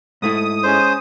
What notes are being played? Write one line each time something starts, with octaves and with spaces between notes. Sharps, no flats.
G#2 A3 E4 D#6
G#3 C#4 C5